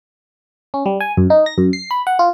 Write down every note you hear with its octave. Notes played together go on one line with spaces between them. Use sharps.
C#4
G3
G#5
F#2
D#4
A#6
F#2
C7
B5
F#5
F4